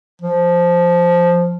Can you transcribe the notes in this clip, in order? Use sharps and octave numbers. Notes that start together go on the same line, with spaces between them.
F3